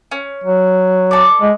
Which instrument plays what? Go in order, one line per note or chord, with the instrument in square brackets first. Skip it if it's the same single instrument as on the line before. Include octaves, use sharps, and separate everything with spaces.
[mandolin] C#4
[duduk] F#3
[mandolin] A4 D5
[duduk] G#3